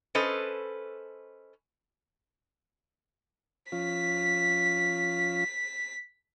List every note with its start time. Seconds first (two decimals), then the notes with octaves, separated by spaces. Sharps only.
0.15 C#4 A4 B4 C5 D#5
3.72 F3 C#4 F4 B6